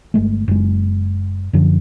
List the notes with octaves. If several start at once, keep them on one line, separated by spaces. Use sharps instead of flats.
G1 G#3 A3
F#1 G#3
F#2 D3 F3